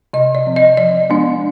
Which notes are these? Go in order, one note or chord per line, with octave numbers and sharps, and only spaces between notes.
C3 D#5
D5
F3 C4
D#5
F3 D5
G#3 B3 D4